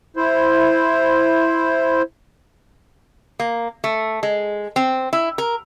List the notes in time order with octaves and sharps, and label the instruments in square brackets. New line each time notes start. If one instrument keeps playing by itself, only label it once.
[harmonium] E4 C5
[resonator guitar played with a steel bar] A#3
A3
G#3
C4
E4
A#4